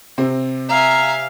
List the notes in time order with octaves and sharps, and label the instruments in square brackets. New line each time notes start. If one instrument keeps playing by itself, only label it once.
[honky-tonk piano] C3 C4
[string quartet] E5 G#5 [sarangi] F5 [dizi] A#5